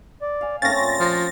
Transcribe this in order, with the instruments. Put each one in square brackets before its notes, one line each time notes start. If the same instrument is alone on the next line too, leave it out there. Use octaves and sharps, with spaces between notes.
[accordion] D5
[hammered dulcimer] F5 G#5
[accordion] G#2 A#3 F5 [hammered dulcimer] A3 C4 C#4 [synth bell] A6 A#6
[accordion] A#2 C6
[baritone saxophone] F3